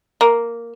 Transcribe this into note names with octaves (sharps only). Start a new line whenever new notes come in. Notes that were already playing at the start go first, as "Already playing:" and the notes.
A#3